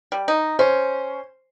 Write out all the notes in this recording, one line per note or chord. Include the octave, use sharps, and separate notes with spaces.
G3
D#4
C#4 C5